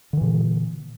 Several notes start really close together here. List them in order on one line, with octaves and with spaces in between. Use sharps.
D3 E3 A#2